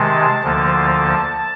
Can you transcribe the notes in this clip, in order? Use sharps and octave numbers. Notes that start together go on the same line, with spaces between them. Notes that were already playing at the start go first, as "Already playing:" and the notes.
Already playing: C3 D#3 G#3 A5
D2 D3 F3 A#3